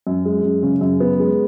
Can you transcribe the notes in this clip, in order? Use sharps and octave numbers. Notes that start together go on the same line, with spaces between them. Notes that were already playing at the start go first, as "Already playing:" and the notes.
F#2
G#3
F#2
C#3
F#2
B3
G#3